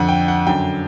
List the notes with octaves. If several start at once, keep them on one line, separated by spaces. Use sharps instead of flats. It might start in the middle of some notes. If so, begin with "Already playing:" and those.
Already playing: F2 D3 F#5
G5
F#5
F#2 D3 G5